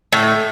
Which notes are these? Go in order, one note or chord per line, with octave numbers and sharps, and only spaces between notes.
A2